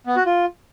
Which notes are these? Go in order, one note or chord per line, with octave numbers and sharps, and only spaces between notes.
B3
F#4
F4